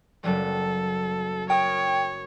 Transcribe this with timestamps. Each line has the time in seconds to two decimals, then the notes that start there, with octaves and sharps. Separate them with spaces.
0.24 F#1 F#3 G3 A4
1.50 A#4 C#5 G5 D#6